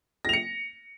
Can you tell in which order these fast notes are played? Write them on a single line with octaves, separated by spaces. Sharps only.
A#6 F7 C#7